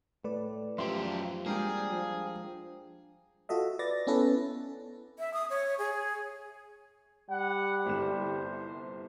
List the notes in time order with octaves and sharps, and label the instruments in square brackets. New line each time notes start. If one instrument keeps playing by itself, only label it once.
[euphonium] A2 [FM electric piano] A3 B4 D5
[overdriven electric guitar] F#2 G4 [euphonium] F3 [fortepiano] E5 C6
[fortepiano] G3 A#3 [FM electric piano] G#3 D4 G5 [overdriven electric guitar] G#4
[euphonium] F3
[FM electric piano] F4 F#4 A4 D#5 E5
B4 D5 A6 A#6
B3 C#4 E4 A4 B4
[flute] E5
D#6
C#5
G#4
[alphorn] G3 [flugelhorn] F#5
[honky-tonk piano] G1 C2 E7 [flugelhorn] C5